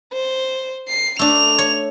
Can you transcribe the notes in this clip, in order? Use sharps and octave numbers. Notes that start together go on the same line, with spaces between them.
C5
C7
A3 D4 F7
C#5